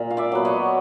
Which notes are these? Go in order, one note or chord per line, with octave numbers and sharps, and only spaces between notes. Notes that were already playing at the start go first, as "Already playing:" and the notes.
Already playing: A#2
F5
D5 E5
F#3 B3
C#5 D#5